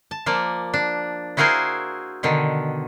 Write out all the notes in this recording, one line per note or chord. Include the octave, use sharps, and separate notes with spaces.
A5
F3 A#3 D5
D4
E4 F#4 G#4 A#4 C5 F5
B2 D3 D#3